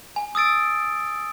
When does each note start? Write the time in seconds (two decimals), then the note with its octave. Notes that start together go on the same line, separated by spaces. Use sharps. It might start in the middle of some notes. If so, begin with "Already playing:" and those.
0.16 G#5
0.35 D#6 E6 A6 D7